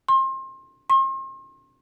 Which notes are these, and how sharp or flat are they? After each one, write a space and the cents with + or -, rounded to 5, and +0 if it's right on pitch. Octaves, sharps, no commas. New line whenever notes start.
C6 +30
C6 +40